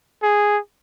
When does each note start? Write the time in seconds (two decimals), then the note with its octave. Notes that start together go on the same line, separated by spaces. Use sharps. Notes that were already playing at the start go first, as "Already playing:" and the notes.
0.23 G#4